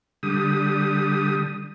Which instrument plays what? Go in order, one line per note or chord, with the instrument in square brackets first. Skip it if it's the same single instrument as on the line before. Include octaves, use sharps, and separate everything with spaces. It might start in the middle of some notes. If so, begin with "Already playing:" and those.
[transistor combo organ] D3 G3 D#6